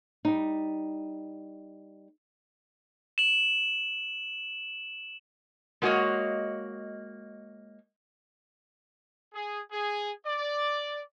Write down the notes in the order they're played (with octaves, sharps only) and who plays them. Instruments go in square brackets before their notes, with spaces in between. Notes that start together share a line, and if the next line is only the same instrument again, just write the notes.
[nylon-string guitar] G3 D#4
[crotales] E7 F#7
[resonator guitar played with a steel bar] G#3 A#3 F#4 C#5 D#5 F5
[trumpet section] G#4
G#4
D5